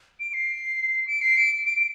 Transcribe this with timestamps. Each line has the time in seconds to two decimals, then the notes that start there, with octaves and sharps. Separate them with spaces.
0.20 D7
0.34 C7
1.07 D7
1.22 C7
1.37 D7
1.66 D7